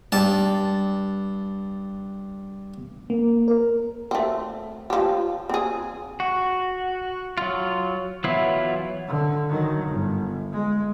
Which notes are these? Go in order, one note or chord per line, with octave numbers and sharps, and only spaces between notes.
G2 A5
A#3
A#4
A3 C4
F3 G4
C4 G#4
F#4
F#3 F4
E3 F#3 B3 E4 F4
D3
D#3 F#3
G1
G#3